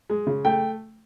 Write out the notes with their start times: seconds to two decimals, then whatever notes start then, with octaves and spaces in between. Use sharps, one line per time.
0.10 G#3
0.27 C#3
0.45 A3 G5